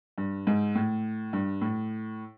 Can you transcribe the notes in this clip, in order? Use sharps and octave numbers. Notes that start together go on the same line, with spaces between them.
G2
G#2
A2
G2
A2